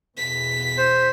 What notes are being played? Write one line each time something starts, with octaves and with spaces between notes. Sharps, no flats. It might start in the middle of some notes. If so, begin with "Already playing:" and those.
E2 B2 B6
C5